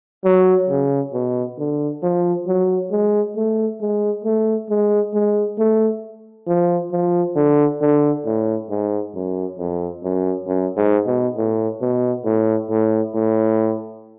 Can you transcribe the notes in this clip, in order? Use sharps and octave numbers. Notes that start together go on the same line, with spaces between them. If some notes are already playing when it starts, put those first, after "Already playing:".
F#3
C#3
B2
D3
F3
F#3
G#3
A3
G#3
A3
G#3
G#3
A3
F3
F3
D3
D3
A2
G#2
F#2
F2
F#2
F#2
G#2
B2
A2
B2
A2
A2
A2